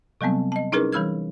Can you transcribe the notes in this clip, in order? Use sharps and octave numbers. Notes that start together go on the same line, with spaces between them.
C3 F#3 G3 B3 C4
D#5 A5
C#4 D#4 E4 G#4 A#4 B4
E3 G3 B5 E6 F6 G#6